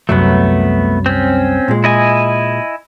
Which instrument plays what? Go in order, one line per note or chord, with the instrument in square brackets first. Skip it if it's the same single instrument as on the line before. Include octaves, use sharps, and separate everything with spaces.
[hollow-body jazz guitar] C2 F#2 F#3 [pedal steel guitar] A3 B3
[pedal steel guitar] C4 C#4
[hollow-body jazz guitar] A#2 G#3
[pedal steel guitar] E4 D#5 G#5